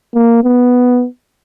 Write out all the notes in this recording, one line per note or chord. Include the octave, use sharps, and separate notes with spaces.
A#3
B3